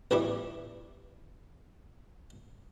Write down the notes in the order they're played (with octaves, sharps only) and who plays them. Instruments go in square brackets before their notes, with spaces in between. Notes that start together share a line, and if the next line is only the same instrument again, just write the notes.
[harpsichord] A1 B2 E3 G3 E4 D6